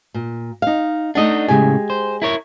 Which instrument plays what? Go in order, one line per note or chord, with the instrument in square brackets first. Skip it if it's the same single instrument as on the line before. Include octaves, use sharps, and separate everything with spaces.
[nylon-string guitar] A#2
D#4 F5
[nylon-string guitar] A3 D#4 F#5 [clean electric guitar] D4 D#5
[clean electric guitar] A2 C#3 [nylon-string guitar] G#3 G4 G#5
[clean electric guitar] C5
E4 A#4 C#5